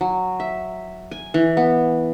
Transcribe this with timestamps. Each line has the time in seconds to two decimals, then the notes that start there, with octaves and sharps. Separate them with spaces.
0.01 F#3
0.40 E5
1.11 G#5
1.34 E3
1.57 B3